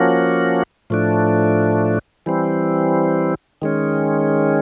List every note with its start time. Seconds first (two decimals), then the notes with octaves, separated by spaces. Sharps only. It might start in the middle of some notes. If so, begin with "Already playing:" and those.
Already playing: F3 A#3 C#4 F#4
0.90 A2 F3 A3 D4
2.26 E3 G3 C4
3.62 D#3 G#3 C#4